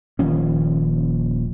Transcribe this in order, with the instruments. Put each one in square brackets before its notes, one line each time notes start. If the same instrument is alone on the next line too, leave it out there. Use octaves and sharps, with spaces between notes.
[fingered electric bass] D#1 D#2 F3 C#4